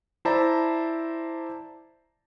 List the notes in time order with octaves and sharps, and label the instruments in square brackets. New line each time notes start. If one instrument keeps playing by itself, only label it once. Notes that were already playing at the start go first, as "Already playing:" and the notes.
[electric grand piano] E4 C5 D5 E5 A5 A#5